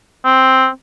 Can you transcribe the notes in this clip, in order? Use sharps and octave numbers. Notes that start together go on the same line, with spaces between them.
C4